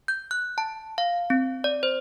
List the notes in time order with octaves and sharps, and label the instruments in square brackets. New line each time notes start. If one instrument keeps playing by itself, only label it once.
[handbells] G6
F#6
A5
F5
C4
D5
C5